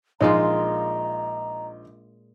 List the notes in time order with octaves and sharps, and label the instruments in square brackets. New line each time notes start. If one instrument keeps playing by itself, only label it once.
[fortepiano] A#1 D#4 [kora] A#2 G#3 F4 [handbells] D#5 [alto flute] A#5